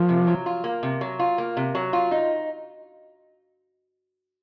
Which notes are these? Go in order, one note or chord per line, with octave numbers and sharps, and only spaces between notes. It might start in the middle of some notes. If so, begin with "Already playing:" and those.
Already playing: F3 A#3
C3
F#3
F4
A#3
C3
F#3
F4
A#3
C3
F#3
F4
D#4